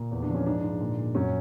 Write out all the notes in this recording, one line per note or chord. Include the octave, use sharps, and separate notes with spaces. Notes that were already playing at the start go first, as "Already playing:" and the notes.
Already playing: A#2
E2
D4
F3
C#4
G#2 D4
G#2
A#2
A#2
F#2 C#4